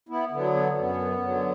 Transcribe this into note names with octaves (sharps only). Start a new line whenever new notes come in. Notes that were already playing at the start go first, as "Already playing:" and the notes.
B3 E4
D3 F#3 B3
B3
F#2 B3
D3 F#3